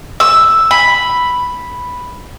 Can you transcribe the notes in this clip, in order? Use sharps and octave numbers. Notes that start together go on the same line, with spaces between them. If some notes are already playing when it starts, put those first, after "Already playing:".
E6
B5